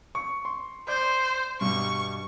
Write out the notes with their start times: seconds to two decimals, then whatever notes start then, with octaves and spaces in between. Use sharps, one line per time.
0.15 C#6
0.45 C6
0.88 C5 D5 G6
1.61 G2 B2 G3 C#6